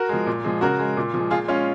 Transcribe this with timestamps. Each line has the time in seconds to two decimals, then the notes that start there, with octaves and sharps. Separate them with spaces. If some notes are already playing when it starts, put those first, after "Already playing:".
Already playing: F#4 A#4
0.09 F3 G#3
0.27 A#2
0.44 F3 G#3
0.61 C#3 F#4 A#4
0.79 G#3
0.97 A#2
1.14 F3 G#3
1.31 A#2 F4 G#4
1.48 G#3 C#4 F4